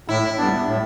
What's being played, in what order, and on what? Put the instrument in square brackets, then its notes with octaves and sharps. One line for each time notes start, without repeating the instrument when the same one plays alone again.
[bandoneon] A2 [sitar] E4
[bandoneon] G3 B3 D4
A2